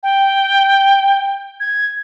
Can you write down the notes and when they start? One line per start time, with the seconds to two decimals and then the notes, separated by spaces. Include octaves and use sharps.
0.03 G5
1.60 G#6